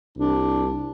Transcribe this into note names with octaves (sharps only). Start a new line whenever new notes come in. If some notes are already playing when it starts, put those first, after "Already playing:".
C2 D4